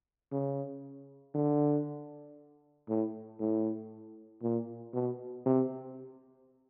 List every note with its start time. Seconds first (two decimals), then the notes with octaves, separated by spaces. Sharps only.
0.32 C#3
1.34 D3
2.88 A2
3.40 A2
4.42 A#2
4.94 B2
5.46 C3